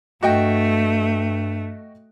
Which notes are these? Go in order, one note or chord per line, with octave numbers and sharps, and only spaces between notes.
G2 A3 F#4 D#5 G5